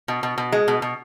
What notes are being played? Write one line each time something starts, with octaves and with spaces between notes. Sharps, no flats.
B2
B2
B2
G#3
B2
B2